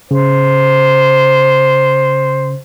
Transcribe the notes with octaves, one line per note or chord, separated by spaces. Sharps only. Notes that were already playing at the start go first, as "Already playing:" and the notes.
C#3 C5